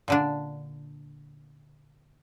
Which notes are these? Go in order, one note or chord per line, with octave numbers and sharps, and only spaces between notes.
A#2 D3 D4